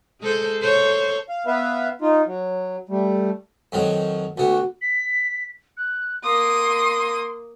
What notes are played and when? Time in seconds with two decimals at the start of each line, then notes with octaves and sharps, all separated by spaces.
0.21 G#3 A4 C5
0.59 A4 C5 C#5
1.29 F5
1.47 B3 B4 E5 F5
2.02 D#4 F4
2.26 F#3
2.89 G3 A3
3.72 F2 D#3 F#3
4.38 D2 B3 F#4
4.82 B6
5.77 F#6
6.24 A#3 C6 D#6